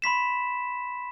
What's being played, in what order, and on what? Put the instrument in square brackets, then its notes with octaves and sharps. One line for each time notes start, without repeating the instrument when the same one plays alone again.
[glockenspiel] B5 C6 B6 E7